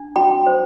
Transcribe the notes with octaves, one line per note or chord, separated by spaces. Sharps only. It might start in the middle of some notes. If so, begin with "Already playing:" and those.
Already playing: D4
F#4 G5 B5
C5